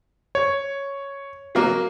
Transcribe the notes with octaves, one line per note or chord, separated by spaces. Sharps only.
C#5
F#3 A#3